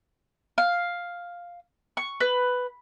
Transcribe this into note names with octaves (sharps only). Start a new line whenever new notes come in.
F5
C#6
B4